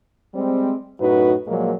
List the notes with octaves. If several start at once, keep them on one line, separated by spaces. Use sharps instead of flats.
G3 G#3 C4
F#2 A2 D#4 F#4 B4
A#2 F3 F#3 G#3 A#3